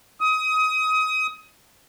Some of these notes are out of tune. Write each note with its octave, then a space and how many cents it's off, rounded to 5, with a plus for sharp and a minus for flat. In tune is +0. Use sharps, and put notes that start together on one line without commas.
D#6 +25